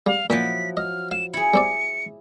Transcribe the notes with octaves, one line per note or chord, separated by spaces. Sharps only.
G3 F5
A#2 F3 F#3 E4 B6
D#5 F6
F5 E7
E4 G#4 C#7
G3 C4 D5